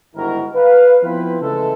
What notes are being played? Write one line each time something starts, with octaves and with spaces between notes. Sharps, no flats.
G1 G#2 D#3 E4 F#4 A#4
B4 F5
F3 B3 C4 E4 F4 B4
C#3 E3 G#3 A3 A4